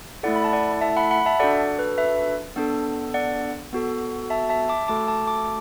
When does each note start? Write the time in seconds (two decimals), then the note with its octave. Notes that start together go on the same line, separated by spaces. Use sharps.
0.23 A3 E4 A4 D5 F#5
0.36 B5
0.44 A5
0.53 D5 F#5
0.81 E5 A5
0.97 F#5 B5
1.11 F#5 B5
1.26 E5 A5
1.40 D4 F#4 A4 D5 F#5
1.79 B4
1.98 B4 E5
2.56 B3 D4 A4
3.14 D5 F#5
3.73 B3 F#4 A4
4.30 E5 A5
4.49 E5 A5
4.69 A5 D6
4.88 A3 F#4 A4 A5 D6
5.08 A5 D6
5.27 A5 D6